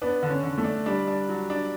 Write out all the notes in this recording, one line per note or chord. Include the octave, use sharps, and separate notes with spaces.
B3 D4
D3
C#4
D3
A3
D4
G3 D4
D4
F#3
D4